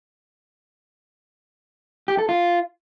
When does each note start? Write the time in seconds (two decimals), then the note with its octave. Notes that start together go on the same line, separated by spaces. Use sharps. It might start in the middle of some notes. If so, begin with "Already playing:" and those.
2.08 G4
2.18 A4
2.29 F4